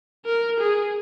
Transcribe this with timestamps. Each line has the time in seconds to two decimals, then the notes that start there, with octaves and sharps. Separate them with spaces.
0.26 A#4
0.60 G#4